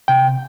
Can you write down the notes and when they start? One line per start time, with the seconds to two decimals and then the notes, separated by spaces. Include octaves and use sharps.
0.08 C3 G5